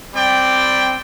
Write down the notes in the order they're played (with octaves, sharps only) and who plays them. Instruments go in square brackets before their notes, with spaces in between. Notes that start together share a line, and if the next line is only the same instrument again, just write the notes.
[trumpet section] G3 C4 G4 D5 G5